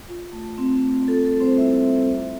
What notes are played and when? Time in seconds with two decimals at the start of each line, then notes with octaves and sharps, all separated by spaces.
0.08 F4
0.33 A3
0.58 C4
0.84 A3
1.08 F4 A4
1.25 A4
1.32 G3
1.41 C4 C5
1.57 A#3 E4 E5
1.83 G3
2.08 E4